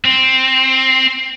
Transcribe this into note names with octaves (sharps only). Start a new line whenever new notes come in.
C4